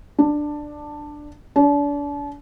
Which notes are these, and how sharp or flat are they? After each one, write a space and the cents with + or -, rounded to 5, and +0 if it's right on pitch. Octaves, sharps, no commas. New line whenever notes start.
D4 +10
D4 -35